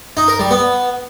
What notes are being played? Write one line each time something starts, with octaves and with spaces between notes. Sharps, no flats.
D#4
A#4
G3
B3